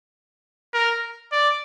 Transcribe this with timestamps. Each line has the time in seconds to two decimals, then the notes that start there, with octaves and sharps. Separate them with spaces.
0.74 A#4
1.32 D5